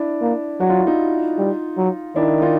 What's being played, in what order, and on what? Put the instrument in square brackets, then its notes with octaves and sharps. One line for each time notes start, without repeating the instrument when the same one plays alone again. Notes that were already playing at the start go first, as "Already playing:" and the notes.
Already playing: [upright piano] D4 E4
[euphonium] A#3
[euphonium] F#3 [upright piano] F#4
[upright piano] F4
E4
D#4 F4
[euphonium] G3
F#3
[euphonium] D#3 [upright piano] D4 E4
[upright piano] D#4 F4